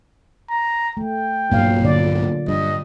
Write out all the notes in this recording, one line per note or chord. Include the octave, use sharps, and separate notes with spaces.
A#5
A3 G5
B1 G2 A#2 F#3 A#3 F5
A#2 D3 D5
G2 D#5